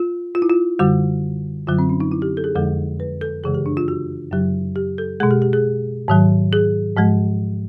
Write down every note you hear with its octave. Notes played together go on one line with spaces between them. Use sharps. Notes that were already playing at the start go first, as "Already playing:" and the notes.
Already playing: F4
F4
E4
F4
F#2 D3 G3 F#4
F#2 D3 F#3 F4
C4
C#4
D#4
E4
G4
A4
G#4
F2 D3 F3 G#3 A4
B4
A4
F#2 C#3 E3 G#3 G#4
G4
D4
F4
F#4
F#2 C#3 F#3 G4
G4
A4
B2 G#3 G#4
G4
G4
G#4
G#2 D#3 F#3
G#4
G#2 F3 G#3